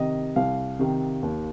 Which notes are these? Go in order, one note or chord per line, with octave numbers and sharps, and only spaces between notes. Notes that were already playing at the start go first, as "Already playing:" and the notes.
Already playing: C3 D#3 D#5
C2 F5
C3 D#3
D#2